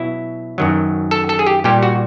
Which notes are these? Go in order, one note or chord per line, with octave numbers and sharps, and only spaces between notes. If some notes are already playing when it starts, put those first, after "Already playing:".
Already playing: B2 F#3 E4
F#2 D#3 F#3
A4
A4
G#4
G4
A#2 G3 G4
F#4